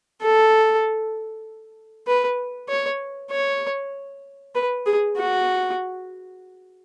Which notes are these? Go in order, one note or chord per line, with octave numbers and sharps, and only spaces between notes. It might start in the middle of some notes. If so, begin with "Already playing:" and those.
A4
B4
C#5
C#5
B4
G#4
F#4